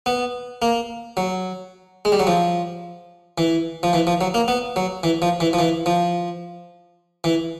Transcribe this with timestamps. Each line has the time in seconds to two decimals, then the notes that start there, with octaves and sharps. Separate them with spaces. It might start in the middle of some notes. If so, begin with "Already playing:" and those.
0.06 B3
0.62 A#3
1.17 F#3
2.05 G#3
2.12 G3
2.20 F#3
2.27 F3
3.38 E3
3.83 F3
3.93 E3
4.07 F3
4.21 F#3
4.34 A#3
4.48 B3
4.76 F#3
5.03 E3
5.22 F3
5.40 E3
5.53 F3
5.59 E3
5.86 F3
7.24 E3